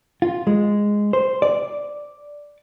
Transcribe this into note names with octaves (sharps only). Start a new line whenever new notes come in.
F4
G#3
C5
D5